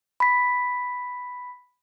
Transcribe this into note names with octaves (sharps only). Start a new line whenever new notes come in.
B5 B6